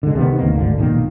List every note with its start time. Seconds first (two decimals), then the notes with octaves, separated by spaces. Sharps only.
0.03 D3 G#3
0.15 C3 D#3 F3 B3
0.38 F#1 D2 D#3 A#3
0.55 G#1 D2 D3
0.78 B1 A#2 D#3 A#3